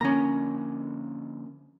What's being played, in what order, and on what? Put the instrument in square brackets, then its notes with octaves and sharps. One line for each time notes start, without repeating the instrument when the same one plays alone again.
[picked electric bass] D3 F3 A#3 [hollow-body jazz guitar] C#4 A#5